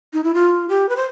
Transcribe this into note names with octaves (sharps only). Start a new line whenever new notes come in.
D#4
E4
F4
G4
B4
C5